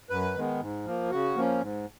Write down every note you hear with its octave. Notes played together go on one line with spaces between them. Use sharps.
F#2 B4
D#3 G#3 B3
G#2
F3 A#3
C#3 F#4
F3 A#3 C#4
G#2